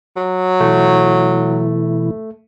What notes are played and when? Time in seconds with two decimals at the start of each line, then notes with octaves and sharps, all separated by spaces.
0.17 F#3
0.60 B2 E3 A3 E4